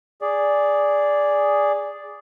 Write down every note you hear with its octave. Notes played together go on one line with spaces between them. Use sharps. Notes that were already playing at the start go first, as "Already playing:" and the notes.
G#4 D5